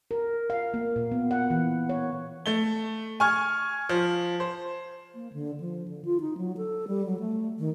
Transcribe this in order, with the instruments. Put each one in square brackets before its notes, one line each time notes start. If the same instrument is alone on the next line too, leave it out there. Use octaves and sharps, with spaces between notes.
[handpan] A#4
F5
A#3
A#2
B3
F#5
E3
C#5
[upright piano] A3 G7
G#5 C#6 F6 G#6
F3
C5
[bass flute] A#3
D3
F3
D3
F4
D#4
F#3
A4
G3
F#3
A3
D#3